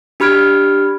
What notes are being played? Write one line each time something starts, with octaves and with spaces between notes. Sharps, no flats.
D4 G4 B5 F6 G#6 D7